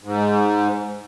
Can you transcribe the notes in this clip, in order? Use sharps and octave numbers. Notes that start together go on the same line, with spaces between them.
G#2